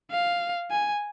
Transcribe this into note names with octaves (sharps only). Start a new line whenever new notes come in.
F5
G#5